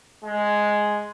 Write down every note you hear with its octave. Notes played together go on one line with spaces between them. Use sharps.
G#3